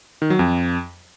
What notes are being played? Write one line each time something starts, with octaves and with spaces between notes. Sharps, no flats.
D#3
F#3
F2